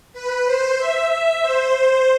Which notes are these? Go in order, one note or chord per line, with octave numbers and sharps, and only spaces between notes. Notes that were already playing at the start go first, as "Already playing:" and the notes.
B4
C5
E5
E5
C5